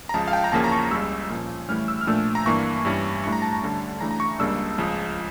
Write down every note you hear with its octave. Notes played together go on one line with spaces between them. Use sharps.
A#5
C#2 C#3 F3 A5
F5
G5
A#5
E2 C#3 F3 A#3 C#4 A5
A#5
C#6
C#2 C#3 G3 E6
A#2 F3 C#4
A2 E3 G3 C#4 F6
E6
F6
A#2 F3 A3 D4 E6
A#5
G2 E3 A#3 D4 C#6
G2 E3 G3 C#4
A2 G3 D4 C#6
A#5
A5
A5
D2 D3 G3 C#4
C#3 E3 A3 D4 A#5
A#5
C#6
C#2 C#3 G3 A#3 D4 E6
C#2 C#3 F3